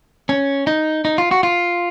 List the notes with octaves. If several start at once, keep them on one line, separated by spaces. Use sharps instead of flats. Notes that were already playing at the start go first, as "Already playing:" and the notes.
C#4
D#4
D#4
F4
F#4
F4